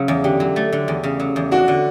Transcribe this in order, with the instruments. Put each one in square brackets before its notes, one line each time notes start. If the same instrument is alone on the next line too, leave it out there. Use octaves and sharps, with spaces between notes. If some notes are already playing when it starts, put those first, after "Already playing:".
Already playing: [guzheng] C#3 F#3
E2
[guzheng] D3 [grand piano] G4
[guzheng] F#3
A3
D3
E2
C#3
F#3
E2
[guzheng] D4 [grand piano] F#4
[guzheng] D3